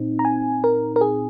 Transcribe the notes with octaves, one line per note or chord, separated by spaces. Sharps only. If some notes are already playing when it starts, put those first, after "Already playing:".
Already playing: A#2 C4 D#4
A#5
G#5
A#4
A#4
G#4